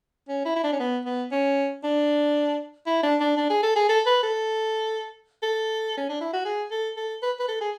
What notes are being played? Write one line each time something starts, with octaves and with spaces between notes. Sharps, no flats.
C#4
E4
E4
D4
C#4
B3
B3
C#4
D4
E4
D4
D4
D4
G#4
A4
G#4
A4
B4
A4
A4
C#4
D4
E4
F#4
G#4
A4
A4
B4
B4
A4
G#4